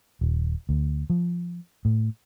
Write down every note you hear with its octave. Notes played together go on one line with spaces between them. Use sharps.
D#1
D2
F3
A2